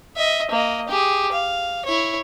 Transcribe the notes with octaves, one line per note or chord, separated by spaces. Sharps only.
D#5 E5
A#3 D#5
G4 G#4
F5
E4 C#5